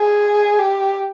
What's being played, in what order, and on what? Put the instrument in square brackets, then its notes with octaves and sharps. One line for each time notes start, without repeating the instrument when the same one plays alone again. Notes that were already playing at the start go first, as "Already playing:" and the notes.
Already playing: [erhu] G#4
G4